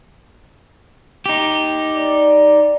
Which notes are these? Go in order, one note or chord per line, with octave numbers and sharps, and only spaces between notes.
D#4 G4
D5